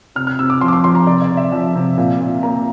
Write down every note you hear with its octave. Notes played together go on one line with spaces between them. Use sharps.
C3 F6
F6
C3 E6
D6
F3 C6
D6
C6
F3 C6
A#5
C3 D5
D5
C3
E5
F3
C3
A#2
A#2
A#3 A#5